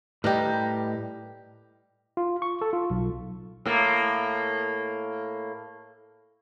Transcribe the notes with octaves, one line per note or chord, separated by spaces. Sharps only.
A2 G3 G4 A#4 B4 D#5
F4
C#6
A4
F4
B1
A2 A#3